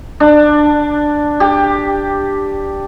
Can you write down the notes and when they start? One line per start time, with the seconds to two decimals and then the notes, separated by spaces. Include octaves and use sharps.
0.20 D4
1.40 G4